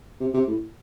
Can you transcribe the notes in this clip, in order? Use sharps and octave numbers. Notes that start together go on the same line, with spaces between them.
C3
C3
A2